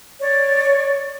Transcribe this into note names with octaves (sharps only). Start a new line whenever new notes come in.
C#5 D5